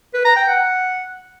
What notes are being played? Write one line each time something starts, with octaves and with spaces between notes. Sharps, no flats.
B4
A#5
G5
F#5